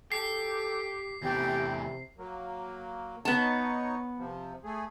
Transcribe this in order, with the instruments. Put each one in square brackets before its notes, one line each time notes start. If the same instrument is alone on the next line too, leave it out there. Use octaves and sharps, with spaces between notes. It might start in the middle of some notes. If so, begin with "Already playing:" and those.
[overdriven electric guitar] G4 [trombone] A4 [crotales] C7
[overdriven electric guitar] E2 A3 [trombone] C3 [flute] G4
[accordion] F#3 A#3
[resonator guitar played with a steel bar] B3 A5 [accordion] D#4 C#5
[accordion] C3 F3
A3 G#4